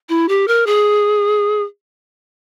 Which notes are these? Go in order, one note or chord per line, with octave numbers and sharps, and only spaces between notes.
E4
G4
A#4
G#4